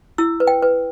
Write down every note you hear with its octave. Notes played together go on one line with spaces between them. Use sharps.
E4 E6
B4
G5
B4